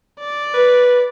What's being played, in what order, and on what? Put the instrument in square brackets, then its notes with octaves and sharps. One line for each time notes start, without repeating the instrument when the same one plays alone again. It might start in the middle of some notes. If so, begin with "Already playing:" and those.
[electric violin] D5
[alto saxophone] B4